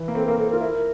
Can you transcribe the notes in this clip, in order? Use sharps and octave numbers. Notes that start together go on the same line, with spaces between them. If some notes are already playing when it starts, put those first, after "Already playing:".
Already playing: E3
A#3
C4 A4
A#3 A#4
C4 A4
A#4
F4
E4 A#4